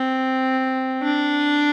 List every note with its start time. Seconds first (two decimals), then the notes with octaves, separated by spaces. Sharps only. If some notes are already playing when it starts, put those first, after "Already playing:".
Already playing: C4
1.03 D4